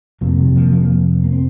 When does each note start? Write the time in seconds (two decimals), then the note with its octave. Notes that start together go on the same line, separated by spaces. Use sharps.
0.21 F2 C3 F3 A#3
0.38 D#3 G3
0.55 F3 A#3
0.72 F3 A#3
0.90 F3
1.24 A#3
1.33 C4